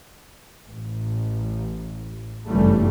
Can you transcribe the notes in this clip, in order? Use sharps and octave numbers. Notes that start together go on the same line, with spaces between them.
A1
G1 F#2 C#3 E3 G3 A3